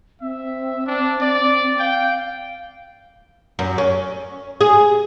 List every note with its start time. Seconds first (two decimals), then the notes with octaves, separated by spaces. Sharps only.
0.22 C4 E5
0.86 D4
1.21 D5
1.79 F5 G5
3.59 F#2
3.78 C#4
4.61 G#4